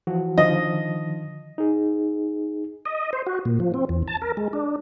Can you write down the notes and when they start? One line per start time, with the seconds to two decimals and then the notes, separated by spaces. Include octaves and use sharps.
0.07 E3 F3 F#4
0.38 D3 D#3 F3 D#5
1.58 D#4 G#4
2.85 D#5
3.13 C5
3.27 F#4
3.45 A#2
3.60 F3
3.74 C4
3.89 E2
4.08 A5
4.22 A#4
4.37 G#3
4.53 D4